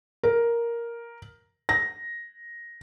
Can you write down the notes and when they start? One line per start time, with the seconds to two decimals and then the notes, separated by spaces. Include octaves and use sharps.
0.23 A#4
1.69 A#6